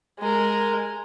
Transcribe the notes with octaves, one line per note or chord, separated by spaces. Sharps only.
G#3 A#4